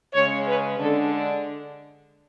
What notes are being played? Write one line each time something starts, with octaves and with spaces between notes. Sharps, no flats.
C#3 G#3 C#4 C#5
B4
D3 G#3 D4 A4